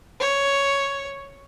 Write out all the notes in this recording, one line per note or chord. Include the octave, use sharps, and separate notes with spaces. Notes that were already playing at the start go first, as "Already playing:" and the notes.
C#5